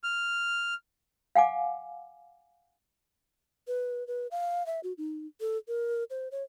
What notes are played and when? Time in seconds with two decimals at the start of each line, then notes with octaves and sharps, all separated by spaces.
0.04 F6
1.35 F5 F#5 G#5 D6
3.67 B4
4.07 B4
4.31 F5
4.66 E5
4.83 F#4
4.98 D#4
5.41 A4
5.68 A#4
6.10 C5
6.31 C#5